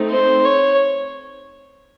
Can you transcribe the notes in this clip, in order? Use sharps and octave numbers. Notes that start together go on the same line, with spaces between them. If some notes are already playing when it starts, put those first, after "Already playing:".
Already playing: A3 C4 D#4
C5
C#5